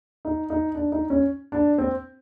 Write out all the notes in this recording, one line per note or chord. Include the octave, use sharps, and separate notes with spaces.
D#4
D#4
D4
D#4
C#4
D4
C4